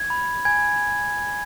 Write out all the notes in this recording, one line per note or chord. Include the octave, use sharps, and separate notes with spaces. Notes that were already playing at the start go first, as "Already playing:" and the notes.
Already playing: G#6
B5
G#5 G#6